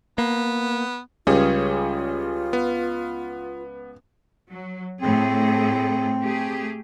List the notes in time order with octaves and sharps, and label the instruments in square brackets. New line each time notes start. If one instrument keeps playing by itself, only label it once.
[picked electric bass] A#3 [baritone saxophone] B3
[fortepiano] C#2 [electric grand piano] G3 C#4 G#4 [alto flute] F4
[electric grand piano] B3
[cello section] F#3
[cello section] A2 G#4 A4 [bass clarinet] C4
[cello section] A3 G4 G#4